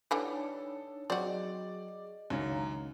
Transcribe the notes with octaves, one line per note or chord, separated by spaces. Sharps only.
D3 E3 G3 D4 D#4 A4 C#5
F#3 C4 F#4 G#4 D5 D#5
C#2 F#2 D#3 F#3 C#4 D4 F5 A#5